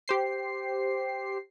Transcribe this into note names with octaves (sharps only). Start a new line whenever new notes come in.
G4 C5 C7